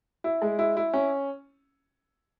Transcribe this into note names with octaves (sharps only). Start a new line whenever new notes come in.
E4
G#3
E4
E4
C#4